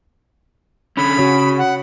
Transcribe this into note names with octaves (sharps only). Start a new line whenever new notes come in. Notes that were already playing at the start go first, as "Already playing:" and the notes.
D3 C#4 B5
C#3 C#4 F#4 C#5
F#5